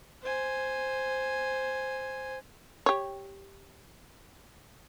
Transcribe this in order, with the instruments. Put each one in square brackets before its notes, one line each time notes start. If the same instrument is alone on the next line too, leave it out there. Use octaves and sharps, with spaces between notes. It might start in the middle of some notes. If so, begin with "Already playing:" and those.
[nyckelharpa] C5 G#5
[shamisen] G4 C#5